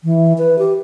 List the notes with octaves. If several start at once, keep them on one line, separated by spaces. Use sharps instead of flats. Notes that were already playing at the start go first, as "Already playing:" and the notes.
E3
B4
G4